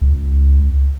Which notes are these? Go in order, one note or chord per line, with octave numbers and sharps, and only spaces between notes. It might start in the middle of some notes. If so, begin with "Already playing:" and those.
C#2